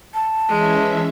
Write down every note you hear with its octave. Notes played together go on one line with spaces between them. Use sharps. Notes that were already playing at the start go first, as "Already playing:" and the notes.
A5
E3 G#3 C#4 E5